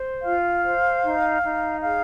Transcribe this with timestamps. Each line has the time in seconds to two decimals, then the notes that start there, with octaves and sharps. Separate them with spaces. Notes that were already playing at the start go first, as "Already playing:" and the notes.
Already playing: C5
0.22 F4 F5
0.62 C5
1.02 D#4
1.42 D#4
1.82 G#4 F5